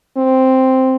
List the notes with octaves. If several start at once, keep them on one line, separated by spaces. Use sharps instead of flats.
C4